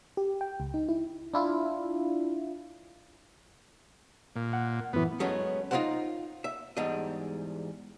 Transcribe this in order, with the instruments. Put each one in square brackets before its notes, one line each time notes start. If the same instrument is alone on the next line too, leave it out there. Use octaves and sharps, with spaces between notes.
[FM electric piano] G4
G5
C#2
D#4
E4
D4 E4 F4
[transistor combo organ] A#2
[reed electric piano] F#5
[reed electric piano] F#2 A2 E3 [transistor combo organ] B3
[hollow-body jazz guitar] F#3 G#3 A3 B3 C#4 F#4
D#4 F4 A4 A#4 C5 F#5
E5
E2 G#2 G3 D4 D#5